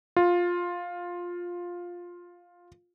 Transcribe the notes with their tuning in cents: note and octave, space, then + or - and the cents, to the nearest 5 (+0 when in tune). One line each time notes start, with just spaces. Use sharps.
F4 +10